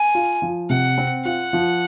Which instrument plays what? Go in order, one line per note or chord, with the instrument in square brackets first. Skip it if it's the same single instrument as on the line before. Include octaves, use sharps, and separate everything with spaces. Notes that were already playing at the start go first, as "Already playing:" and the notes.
Already playing: [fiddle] G#5
[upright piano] F4
F3
[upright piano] C3 [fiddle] F#5
[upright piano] C4
[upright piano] F4 [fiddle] F#5
[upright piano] F3